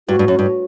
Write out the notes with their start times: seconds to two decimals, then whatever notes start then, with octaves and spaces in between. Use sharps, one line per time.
0.08 G2 F#4
0.19 G2
0.28 F#2
0.39 G2